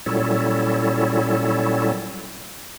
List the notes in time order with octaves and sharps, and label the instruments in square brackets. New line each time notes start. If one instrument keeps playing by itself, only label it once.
[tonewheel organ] A#2 F#3 G3 C#4 E4 A4